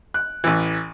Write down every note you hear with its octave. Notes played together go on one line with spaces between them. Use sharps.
F#6
A1 E3